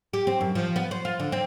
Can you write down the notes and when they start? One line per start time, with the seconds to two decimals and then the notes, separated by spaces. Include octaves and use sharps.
0.13 G4
0.27 C4
0.41 F#2
0.55 F3
0.76 B3
0.91 C5
1.05 F4
1.19 D3
1.32 C4